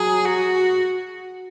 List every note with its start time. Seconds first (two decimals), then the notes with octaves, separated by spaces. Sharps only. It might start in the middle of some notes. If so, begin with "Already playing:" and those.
Already playing: F#3 G#4
0.25 F#4